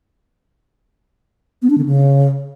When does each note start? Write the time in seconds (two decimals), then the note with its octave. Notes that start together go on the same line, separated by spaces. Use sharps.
1.62 B3
1.70 D4
1.78 D3
1.86 C#3